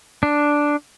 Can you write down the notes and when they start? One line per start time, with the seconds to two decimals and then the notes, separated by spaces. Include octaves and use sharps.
0.23 D4